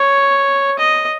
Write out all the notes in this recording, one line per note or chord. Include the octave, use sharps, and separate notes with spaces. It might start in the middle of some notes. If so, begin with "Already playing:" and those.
Already playing: C#5
D#5